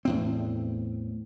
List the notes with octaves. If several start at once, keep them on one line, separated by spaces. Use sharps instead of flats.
E2 A2 C4